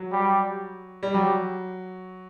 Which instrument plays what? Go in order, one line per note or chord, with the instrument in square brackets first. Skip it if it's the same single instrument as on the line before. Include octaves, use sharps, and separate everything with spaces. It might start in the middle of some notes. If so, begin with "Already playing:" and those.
Already playing: [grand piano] F#3
[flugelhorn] G3
[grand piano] G3
[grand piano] F#3 [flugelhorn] G3